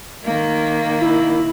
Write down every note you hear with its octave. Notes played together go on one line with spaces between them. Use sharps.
D#3 A#3
E4